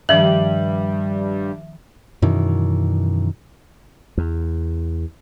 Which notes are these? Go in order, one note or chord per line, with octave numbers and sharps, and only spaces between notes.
G2 D#3 F3 G3 E5 F#7
F#2 B2 D#3 E3
E2